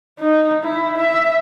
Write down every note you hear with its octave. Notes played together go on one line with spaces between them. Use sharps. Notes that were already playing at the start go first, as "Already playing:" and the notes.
D#4
E4
E5